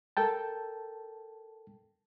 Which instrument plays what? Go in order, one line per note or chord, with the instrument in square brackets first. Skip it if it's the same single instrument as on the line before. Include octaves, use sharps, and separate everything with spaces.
[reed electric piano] A4 A#4 G5 A5